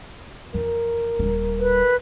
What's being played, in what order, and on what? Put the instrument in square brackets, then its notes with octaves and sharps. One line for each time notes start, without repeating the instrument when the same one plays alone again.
[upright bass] F2 E3 [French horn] A#4
[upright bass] D#1 G3
[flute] B4